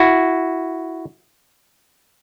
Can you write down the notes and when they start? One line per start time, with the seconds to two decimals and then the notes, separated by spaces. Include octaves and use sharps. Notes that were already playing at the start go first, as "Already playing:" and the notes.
Already playing: E4 F#4